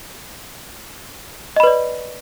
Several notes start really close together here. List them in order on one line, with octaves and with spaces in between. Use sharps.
D#5 B5 B4 D5